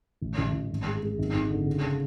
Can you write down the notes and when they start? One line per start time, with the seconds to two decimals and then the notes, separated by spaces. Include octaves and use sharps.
0.21 A1
0.38 A1
0.53 A1
0.71 G#1
0.86 G#3
1.03 G#3
1.18 G#1
1.34 G#1
1.50 D3
1.67 C#3
1.83 C#3